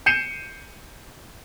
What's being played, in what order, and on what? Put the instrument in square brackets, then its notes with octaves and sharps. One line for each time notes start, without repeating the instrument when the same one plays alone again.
[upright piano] G6 C7 C#7 D#7 E7